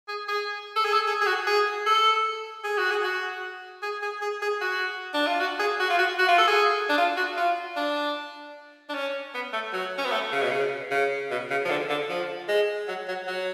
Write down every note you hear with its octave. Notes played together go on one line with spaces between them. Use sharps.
G#4
G#4
A4
G#4
A4
G#4
G#4
F#4
G#4
A4
G#4
F#4
G#4
F#4
G#4
G#4
G#4
G#4
F#4
D4
F4
F#4
G#4
F#4
F4
F#4
F#4
F4
A4
G#4
D4
F4
F#4
F4
D4
D4
C#4
B3
A3
F#3
C#4
B3
A3
C#3
B2
C#3
C#3
B2
C#3
F3
D3
D3
F3
G#3
F#3
F#3
F#3